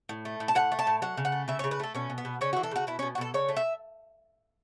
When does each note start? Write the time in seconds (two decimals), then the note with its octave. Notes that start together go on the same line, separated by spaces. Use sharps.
0.09 A2
0.25 A3
0.40 A2
0.48 A5
0.55 A2 F#5
0.72 A3
0.79 A5
0.87 A2
1.02 F#3 F#5
1.17 C#3
1.25 F#5
1.32 A3
1.48 C#3 E5
1.59 C#5
1.64 C#3
1.71 B4
1.80 A3 A4
1.95 B2 C#4
2.10 B2
2.18 B3
2.25 B2
2.41 C#3 C#4
2.53 F#4
2.56 E3
2.63 A4
2.71 C#3 F#4
2.87 B2 E4
2.99 C#4
3.02 B2
3.15 F#4
3.18 B2 A4
3.34 C#3 C#5
3.49 A3
3.57 E5